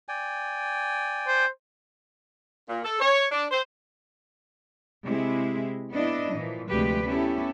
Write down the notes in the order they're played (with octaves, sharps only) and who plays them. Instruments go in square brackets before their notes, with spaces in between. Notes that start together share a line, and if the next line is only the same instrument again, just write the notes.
[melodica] D5 G5 G#5
[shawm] C5
[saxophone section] A#2
A4
C#5
D4
C5
[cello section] C3 G#3 E4
B3 D4 E4 D#5
A#2 E3 F3
D2 C3 F3 G#3 G4 B4
B3 C#4 E4 G4 A4